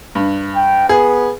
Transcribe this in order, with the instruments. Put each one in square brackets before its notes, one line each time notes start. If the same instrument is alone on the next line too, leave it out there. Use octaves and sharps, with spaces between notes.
[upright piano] G2
[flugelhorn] G5
[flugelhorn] B3 [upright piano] G#4